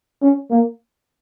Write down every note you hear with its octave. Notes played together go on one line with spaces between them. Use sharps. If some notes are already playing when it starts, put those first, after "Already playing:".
C#4
A#3